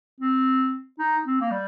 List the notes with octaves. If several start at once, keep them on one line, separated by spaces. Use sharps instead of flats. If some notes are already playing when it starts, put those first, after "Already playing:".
C4
D#4
C4
A#3
G3